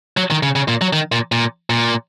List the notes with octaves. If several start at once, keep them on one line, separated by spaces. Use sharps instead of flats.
F#3
D#3
C#3
C#3
A#2
F#3
D#3
A#2
A#2
A#2